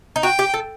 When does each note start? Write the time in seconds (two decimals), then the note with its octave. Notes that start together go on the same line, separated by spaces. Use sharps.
0.16 D#4
0.23 F#4 G5
0.39 G4
0.54 A4